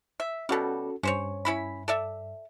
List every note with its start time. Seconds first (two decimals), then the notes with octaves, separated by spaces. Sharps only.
0.20 E5
0.49 B2 G3 C#4 F#4 A4
1.03 G2 C#4 C5 C#5
1.45 C#4 E4 B5
1.88 A4 D5 E5